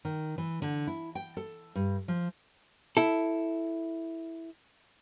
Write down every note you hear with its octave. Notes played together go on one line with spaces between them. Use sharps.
D#3
E3
D3
E4
G5
A4
G2
F3
E4 A4